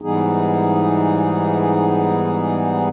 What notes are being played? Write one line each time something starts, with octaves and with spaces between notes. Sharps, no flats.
G#2 E3 G3 B3 D#4 G#4